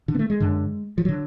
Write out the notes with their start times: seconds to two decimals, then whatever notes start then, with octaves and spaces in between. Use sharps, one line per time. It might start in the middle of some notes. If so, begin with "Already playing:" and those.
0.08 D3
0.15 B3
0.19 A3
0.30 G#3
0.40 F#2 D3
0.98 F3
1.05 D3 F#3